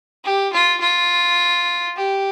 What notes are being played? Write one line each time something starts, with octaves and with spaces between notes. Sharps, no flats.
G4
F4
F4
G4